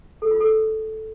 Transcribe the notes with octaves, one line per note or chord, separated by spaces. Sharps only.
A4
F4
A4